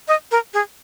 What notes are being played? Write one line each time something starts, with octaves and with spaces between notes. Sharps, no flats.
D#5
A#4
G#4